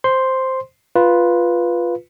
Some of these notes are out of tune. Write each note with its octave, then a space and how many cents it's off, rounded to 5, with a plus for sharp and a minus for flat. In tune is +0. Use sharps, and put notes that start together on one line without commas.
C5 +0 C6 +0
F4 +0 B4 -5